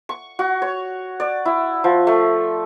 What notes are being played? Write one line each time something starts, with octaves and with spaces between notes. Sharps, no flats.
C#6
F#4
C#5
D5
E4
F3
A3